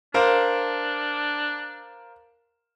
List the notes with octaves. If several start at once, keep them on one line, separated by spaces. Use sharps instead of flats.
D4 A#4 C5 F5